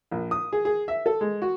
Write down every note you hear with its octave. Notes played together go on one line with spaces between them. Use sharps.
A#1
D#6
G#4
G#4
E5
A4
G#3
F#4